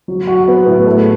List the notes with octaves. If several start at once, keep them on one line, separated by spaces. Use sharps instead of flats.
F#3
F#4
B3
A2
A3